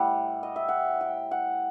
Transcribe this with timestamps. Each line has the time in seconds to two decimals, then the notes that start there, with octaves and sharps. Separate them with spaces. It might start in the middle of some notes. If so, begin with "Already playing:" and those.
Already playing: A2 G3 F#5
0.43 D#5
0.56 E5
0.68 F#5
1.01 G5
1.31 F#5